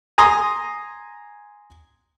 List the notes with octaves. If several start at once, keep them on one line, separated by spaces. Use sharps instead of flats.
G#5 A#5 C6 D#6